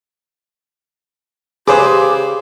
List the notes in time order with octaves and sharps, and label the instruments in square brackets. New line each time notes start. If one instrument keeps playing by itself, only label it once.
[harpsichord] C#3 B4 [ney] G4 [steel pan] G#4 [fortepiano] C5 D6